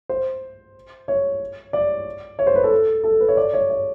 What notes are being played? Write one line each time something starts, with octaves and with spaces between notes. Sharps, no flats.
C5
C#5
D5
C#5
C5
B4
A4
A4
B4
C#5
D5
C#5
C#5